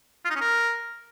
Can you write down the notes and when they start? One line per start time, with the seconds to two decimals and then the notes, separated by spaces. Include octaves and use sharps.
0.25 F4
0.30 D#4
0.35 C#4
0.41 A#4